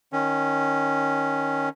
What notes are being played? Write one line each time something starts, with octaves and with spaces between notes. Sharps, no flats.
D#3 C#4